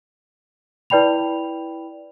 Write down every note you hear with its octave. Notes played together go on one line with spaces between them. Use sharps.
E4 B4 D5 G5 B5 F7